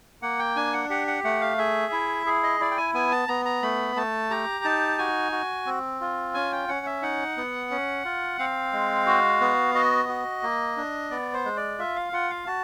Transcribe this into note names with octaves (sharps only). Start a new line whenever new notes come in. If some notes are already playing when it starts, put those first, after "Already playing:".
A#3 F#5
G5
D4 G#5
F#5
G4 F#5
F#5
A3 F#5
F5
G#4 E5
E4
G#4
D#5
E4 D5
G5
G#5
B3 G#5
A5
B3 A#5
A#5
A3 B5
A3 A5
G4 A#5
D#4 A5
F#4 G#5
F#4
C4
F4
C#4 G#5
G5
C#4 F#5
E5
D#4 F#5
B3
C#4
F4
C4 F5
G#3
F#4
B3
F#4 D#5
F#4
A#3
D4
B3 D5
C5
G#3
D5
F4 E5
F5
F4 F#5
F5
F#4 A5